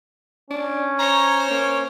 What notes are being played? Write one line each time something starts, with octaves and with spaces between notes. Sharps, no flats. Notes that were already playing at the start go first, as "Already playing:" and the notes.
C#4 D4
C5 C#5 A#5
A#3 C#4